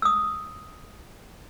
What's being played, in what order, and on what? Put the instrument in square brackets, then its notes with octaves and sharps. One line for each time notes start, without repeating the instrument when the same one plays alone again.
[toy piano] D#6 E6